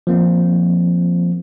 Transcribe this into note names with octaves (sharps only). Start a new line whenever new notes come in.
F3 A#3 C4